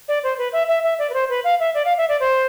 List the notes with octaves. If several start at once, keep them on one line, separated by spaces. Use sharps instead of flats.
D5
C5
B4
E5
E5
E5
D5
B4
C5
B4
F5
E5
D5
F5
E5
D5
C5